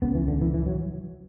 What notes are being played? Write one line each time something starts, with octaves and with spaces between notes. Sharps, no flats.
C#2 C#3 B3
E3
D3
E3
E3
F#3